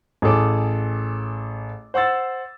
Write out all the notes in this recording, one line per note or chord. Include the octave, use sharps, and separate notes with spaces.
A1 G#4 A4 D6
C5 F#5 C6 E6 A6